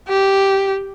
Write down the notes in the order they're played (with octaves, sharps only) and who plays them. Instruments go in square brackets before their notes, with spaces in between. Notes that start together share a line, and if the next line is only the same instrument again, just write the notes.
[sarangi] G4